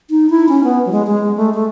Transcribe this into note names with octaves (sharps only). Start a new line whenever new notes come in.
D#4
E4
C#4
B3
F#3
G#3
G#3
A3
A3